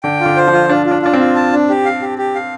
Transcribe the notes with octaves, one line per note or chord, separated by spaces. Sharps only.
D3 G5
F4
D3
C5
F3
F4
D4 F4
F4
D4
D4 F4
C4
F4
A5
D4
G4
F5
G4
G4
F5